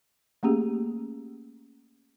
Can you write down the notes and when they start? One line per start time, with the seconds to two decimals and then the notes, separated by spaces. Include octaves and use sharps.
0.43 A3 A#3 C#4 G4 G#4